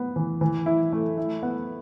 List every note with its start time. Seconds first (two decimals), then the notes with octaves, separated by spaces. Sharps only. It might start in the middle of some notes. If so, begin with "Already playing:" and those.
Already playing: B3
0.16 E3
0.41 E3
0.66 E4
0.93 A3
1.17 E4
1.43 B3